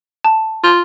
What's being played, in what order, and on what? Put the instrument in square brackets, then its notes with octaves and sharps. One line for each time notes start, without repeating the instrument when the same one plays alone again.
[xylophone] A5
[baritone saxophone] F4